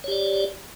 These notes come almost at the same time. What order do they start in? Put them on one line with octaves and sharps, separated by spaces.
C#5 G4 D5